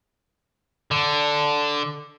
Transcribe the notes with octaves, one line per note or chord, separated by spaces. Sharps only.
D3